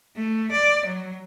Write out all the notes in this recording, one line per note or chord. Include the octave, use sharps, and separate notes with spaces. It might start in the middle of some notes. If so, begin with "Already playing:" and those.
A3
D5
F#3